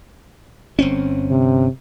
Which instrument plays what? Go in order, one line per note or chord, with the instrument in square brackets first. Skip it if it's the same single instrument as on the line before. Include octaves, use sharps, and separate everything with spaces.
[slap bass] G1 C4 C#4
[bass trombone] C3